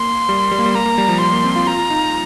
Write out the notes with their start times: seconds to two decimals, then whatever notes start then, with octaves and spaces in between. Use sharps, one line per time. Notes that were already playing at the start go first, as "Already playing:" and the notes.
Already playing: A#3 C6
0.29 G3
0.51 G3
0.58 A#3
0.66 G3
0.75 A#3 A#5
0.86 A#3
0.98 G3
1.09 F3
1.20 G3 C6
1.32 A#3
1.44 C4
1.56 F4
1.67 F4 A#5
1.90 D#4